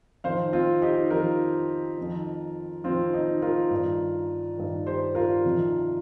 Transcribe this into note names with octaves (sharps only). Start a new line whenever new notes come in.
F2 D#3 C5 F5
C4 F4
D#4 G4
F2 D#3 F4 A#4
F2 D#3
F2 D#3 C4 F4
D#4
F4 A#4
G2 D#3
G2 D#3
G4 C5
F4 A#4
F2 C3 D#3